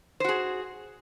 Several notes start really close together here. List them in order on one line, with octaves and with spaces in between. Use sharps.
C5 F#4 G#4